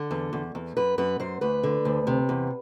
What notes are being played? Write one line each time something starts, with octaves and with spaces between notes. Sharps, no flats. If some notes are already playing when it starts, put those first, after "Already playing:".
Already playing: D3
E2
E2
E2
F#2 B4
F#2 B4
F#2 C5
D2 B4
D3
D2
C3
E2